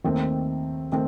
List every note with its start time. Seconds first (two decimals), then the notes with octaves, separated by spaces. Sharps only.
0.04 D#2 D#3 A3 C4
0.92 D#3 A3 C4